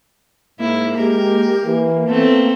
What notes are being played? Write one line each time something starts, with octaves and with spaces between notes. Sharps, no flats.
G#2 A#3 E4
G#3 G4 A#4
E3
A3 B3 C4 A4